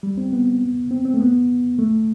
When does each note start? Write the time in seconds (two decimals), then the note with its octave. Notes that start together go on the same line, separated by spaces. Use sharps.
0.03 G3
0.17 C4
0.33 B3
0.91 C4
1.05 C4
1.14 A3
1.20 B3
1.79 A3